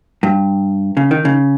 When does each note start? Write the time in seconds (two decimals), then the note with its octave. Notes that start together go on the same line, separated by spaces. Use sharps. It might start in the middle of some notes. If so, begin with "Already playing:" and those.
0.23 G2
0.97 C#3
1.11 D#3
1.25 C#3